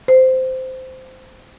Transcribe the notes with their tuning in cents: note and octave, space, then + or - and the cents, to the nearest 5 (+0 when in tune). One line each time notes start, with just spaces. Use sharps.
C5 -10